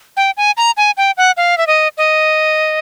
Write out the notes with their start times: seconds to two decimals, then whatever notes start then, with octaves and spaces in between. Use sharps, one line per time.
0.17 G5
0.37 G#5
0.57 A#5
0.77 G#5
0.97 G5
1.17 F#5
1.37 F5
1.58 E5
1.67 D#5
1.98 D#5